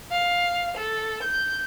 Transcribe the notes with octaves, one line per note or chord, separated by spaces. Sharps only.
F5
A4
G6